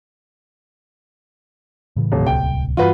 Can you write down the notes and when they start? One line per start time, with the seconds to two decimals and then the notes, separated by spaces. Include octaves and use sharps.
1.96 A2 C#3 E3
2.12 D#1
2.27 D1 C2 G5
2.77 G2 E3 F4 F#4 B4